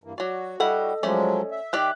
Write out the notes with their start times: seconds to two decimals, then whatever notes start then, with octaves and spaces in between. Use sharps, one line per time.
0.04 G2 E3 A#3
0.18 F#3 F#4 D5
0.60 G3 E4 A4 D#5 F#5
1.03 F3 F#3 G#3 A3 C#4 D5
1.51 E5
1.73 D#3 G4 D5 F#6